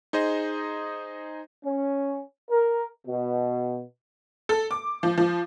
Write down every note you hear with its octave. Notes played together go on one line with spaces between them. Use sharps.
D#4 G#4 C5 D#5
C#4
A#4
B2
A4
D6
F3
F3